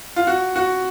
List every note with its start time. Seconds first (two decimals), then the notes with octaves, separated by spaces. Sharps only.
0.16 F4
0.27 F#4
0.56 F#4